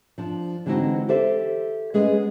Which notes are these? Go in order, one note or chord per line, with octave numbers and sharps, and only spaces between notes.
F3 D4
D3 E3 G#3 C4 D#4 F#4
G4 A4 C5 D5 E5
G3 G#3 B3 C#4 G#4